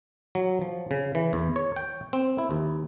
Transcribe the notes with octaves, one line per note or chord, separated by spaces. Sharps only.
F#3
F3
C#3
E3
E2
C#5
G5
C4
E4
D#2